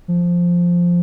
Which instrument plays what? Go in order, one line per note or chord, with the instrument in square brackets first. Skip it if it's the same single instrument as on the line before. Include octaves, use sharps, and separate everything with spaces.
[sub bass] F3